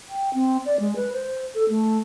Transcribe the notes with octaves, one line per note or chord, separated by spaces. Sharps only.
G5
C4
D5
G#3
B4
C5
A4
A3